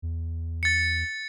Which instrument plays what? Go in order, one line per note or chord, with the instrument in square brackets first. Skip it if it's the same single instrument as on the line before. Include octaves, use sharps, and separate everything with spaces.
[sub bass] E2
[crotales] A6 C#7